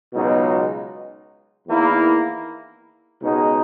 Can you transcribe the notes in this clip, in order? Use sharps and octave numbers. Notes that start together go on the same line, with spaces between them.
C#2 B2 F#3 B3 D#4
E2 D#3 A#3 E4
C#2 B2 G#3 D#4